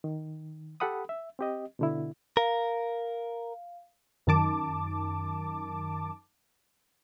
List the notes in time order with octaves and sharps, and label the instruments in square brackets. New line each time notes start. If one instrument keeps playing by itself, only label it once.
[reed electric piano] D#3
G4 A4 F#5 B5 D#6
E5
C4 G4 D#5
B2 D3 E4
[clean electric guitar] A#4 [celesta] F5
[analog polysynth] F#2 D#3 A5 D6